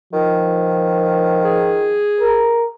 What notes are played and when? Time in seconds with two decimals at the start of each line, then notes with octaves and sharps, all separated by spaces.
0.13 D#3 F3
1.44 G#4
2.20 A#4